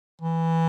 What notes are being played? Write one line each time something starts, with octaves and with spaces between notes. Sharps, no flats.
E3